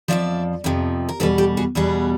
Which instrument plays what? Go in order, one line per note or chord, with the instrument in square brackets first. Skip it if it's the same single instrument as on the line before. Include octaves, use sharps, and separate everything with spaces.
[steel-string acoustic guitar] F2 C3 F3 D5 E5
F2 C3 F3
A#4
E2 B2 G3 A4 B4
G4 A4
F#4 G#4
E2 B2 G3 F#4 G#4